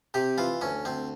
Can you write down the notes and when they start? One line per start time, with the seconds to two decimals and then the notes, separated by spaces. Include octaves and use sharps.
0.14 C3 G4
0.38 E3 F4
0.61 D2 C#4
0.85 D2 C4